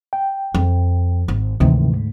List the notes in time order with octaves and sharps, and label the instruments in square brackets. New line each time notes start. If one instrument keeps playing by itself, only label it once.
[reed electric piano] G5
[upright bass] F2
G#1
[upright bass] D2 G#2 [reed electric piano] C3 D#3 E3